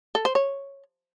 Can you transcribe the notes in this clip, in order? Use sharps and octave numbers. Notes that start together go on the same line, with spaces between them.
A4
C5
C#5